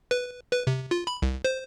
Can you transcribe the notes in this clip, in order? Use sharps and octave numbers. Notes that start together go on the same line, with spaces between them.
B4
B4
C3
F4
B5
C2
C5